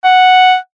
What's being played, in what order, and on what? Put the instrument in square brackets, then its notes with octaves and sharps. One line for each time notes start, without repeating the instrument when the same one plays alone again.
[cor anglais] F#5